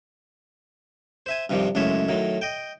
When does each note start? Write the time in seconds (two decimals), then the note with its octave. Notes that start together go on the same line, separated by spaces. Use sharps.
1.26 C5 E5 G#5
1.50 G2 C3 D#3 F3 G3
1.75 C#2 F#2 A2 G#3 C#5 E5
2.09 A2 D#3 F#3
2.41 D#5 G5